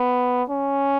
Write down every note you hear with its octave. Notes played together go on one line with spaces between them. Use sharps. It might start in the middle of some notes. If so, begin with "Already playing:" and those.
Already playing: B3
C#4